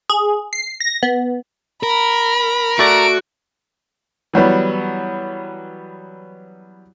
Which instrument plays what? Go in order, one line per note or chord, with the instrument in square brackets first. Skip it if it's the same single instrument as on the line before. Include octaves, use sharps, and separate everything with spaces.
[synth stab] G#4
C7
A#6
B3
[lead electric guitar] A#4 [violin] B5
[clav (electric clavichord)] A3 D5 [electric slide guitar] F#4 [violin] D7
[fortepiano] E3 F#3 G3 B3